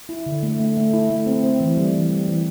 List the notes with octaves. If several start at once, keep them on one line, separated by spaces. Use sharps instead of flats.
E4
D3
A3
A3
A3
E4
A3
C4
C4
E3
G3
E3
G3
E3